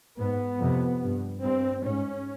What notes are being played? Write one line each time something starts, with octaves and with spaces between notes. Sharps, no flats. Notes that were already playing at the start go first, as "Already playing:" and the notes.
G#2 B3
F2 C3
G2
G2 C4
G#2 C#4